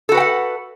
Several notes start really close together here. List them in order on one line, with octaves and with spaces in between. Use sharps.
A4 F#4 B4 G5 F#5